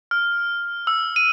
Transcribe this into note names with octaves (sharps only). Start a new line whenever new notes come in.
F6
E6
D#7